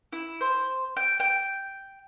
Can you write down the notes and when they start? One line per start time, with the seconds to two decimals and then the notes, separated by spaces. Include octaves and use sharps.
0.13 E4
0.41 C5
0.97 G5
1.20 G5